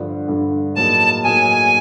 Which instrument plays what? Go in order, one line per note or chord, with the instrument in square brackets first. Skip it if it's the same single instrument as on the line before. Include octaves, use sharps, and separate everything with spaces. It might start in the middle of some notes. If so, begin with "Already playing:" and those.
Already playing: [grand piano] G2 D3 F3
G2 D3 F3
[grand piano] A2 F#3 A#3 D#4 G#4 [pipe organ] A5
[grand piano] A2 F#3 A#3 D#4 G#4 [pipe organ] G#5